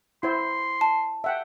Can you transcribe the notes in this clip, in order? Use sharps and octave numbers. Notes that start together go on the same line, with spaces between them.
E4 C5 C6
A5
E5 F#5 G5